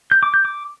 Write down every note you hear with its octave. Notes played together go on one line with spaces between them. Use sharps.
G6
D6
G6
D6